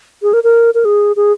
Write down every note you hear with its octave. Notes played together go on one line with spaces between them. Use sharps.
G#4
A#4
A#4
A#4
G#4
G#4